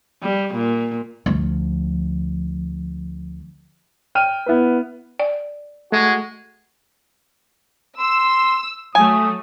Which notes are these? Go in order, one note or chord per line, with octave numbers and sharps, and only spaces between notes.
G3
A#2
D2 F3
G5 F6 D#7
B3 E4 B4
D5
G#3 A3 F#4
C6 E6
F#3 A3 G#5 D#6